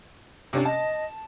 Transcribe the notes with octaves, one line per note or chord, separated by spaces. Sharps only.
C3 C#4 D4
D#5 A5